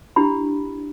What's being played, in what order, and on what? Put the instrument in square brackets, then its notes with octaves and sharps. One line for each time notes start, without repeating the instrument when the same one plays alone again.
[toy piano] D4 E4 G4 B5